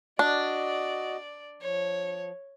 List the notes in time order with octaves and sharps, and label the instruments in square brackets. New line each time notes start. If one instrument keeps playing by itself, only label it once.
[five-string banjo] D4 [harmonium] F#4 D#5 [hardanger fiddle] D5
[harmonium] F3 [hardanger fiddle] C#5